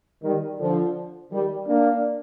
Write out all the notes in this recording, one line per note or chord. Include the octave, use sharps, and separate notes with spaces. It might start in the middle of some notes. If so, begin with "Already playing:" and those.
D#3 G3
D3 F3
D#3 G3
A#3 D4